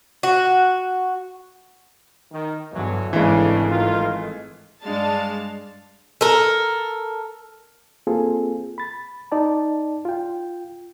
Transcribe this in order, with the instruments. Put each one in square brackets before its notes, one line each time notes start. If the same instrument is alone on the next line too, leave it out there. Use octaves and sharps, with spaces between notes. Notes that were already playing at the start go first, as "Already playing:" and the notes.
[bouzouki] F#4
[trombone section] D#3
[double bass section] E2 G2 [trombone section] D3 E3 F#3
[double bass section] G#1 A3 [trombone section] C#3 D4 [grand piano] E3 G#3
[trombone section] G2 D#3 F4
[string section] G2 G#3 D4 F5 A5 A6
[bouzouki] A4 A#4
[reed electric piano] A#3 C4 F4 G#4 A4
B5 A6
D#4 D5 A5
F4 G5